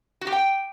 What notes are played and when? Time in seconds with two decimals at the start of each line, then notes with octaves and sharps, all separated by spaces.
0.21 F#4
0.27 G4
0.32 G5